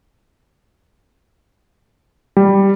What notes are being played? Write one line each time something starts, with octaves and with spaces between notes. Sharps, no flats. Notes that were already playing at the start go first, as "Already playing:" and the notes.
G3